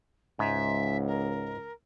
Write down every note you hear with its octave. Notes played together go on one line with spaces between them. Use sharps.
C#2 G#2 E5
A#4